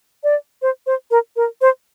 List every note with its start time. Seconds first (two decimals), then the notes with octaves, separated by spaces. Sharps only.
0.24 D5
0.62 C5
0.86 C5
1.11 A#4
1.36 A#4
1.61 C5